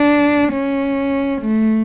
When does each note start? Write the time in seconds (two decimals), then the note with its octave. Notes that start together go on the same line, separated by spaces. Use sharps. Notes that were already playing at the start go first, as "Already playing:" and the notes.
Already playing: D4
0.53 C#4
1.42 A3